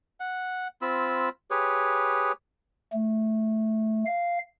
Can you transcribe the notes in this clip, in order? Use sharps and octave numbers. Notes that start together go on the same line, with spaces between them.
F#5
C4 F4 B5 E6
G4 G#4 B4 C#5
A3
F5